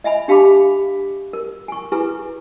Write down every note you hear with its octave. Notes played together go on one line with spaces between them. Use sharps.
D#5 E5 G#5 B5
D4 G4 F5 A5 B5 D6
A#4
G#5 C#6
E4 G#4 B4 G#5 C#6